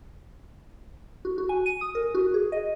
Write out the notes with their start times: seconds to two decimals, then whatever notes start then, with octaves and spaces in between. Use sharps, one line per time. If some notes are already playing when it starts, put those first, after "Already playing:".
1.25 F#4
1.38 F#4
1.49 G#5
1.66 D#7
1.81 D#6
1.95 A#4
2.15 F#4
2.34 G#4
2.52 D#5